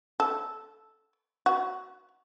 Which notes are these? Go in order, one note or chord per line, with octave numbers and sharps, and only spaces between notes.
A4
F#4